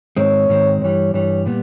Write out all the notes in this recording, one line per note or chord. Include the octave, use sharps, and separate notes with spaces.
G#2 D#3 G#3 C4 C#5
G#2 D#3 G#3 C4
G2 E3 G3 C#5
G2 E3 G3 C#5
A#2 G3 B3